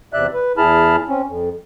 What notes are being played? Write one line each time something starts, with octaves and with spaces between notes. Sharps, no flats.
E2 C3 D5 E5 F#6
B4
E2 E4 G#4 A5 B5 F6
C4 C#4
F2